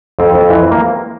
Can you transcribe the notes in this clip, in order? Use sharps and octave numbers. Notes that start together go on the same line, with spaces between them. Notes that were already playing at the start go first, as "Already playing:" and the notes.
F2 C4
F2
E3
A#3